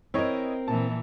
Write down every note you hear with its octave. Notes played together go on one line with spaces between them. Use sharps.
C4 E4 A#4 C#5 D#5
A#2 E3 A5